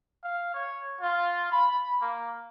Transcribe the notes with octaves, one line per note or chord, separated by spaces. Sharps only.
F5
C#5
F4
B5
A#3